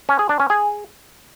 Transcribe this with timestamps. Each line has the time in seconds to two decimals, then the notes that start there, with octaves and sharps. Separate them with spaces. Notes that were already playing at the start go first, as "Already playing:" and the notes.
0.09 C#4
0.19 G#4
0.29 D4
0.40 C#4
0.50 G#4